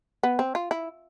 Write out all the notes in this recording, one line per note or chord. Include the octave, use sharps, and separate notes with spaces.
B3
C4
F4
E4